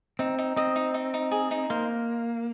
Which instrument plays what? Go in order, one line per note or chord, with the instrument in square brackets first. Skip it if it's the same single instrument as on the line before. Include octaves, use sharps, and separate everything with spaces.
[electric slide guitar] C4 [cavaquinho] D#4
[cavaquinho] D#4
[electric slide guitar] C4 [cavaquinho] D#5
[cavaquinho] D#4
D#4
D#4
G#4
D#4
[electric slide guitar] A#3 [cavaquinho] C5